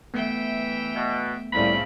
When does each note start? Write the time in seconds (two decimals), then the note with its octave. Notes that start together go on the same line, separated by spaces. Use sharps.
0.14 E3 A3 B3 E5 G5
0.96 B2
1.52 C2 A2 C#3 F3 C4 B5